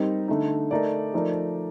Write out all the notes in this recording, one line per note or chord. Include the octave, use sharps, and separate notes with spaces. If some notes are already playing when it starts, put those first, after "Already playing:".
Already playing: G3 C4 D#4 A#4
D3 A3 D#4
A3 D#4 A#4 D5
F3 A3 D#4 A#4 D5